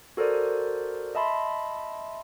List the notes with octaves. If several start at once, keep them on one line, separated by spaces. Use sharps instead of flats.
F#4 A4 A#4 C5 D5
D#5 E5 A5 B5 C6